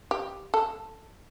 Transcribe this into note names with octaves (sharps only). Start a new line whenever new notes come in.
G4
A4